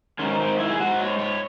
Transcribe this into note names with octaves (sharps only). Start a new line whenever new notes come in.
G#2 D#3 C#4
C4
E4
G#4
G#2 D#3 F#4
C#5
C#5